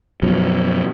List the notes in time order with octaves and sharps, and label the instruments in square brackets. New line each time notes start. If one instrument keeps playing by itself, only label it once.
[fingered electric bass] F#2 B2 F3